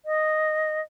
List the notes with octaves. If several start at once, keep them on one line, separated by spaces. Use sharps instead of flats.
D#5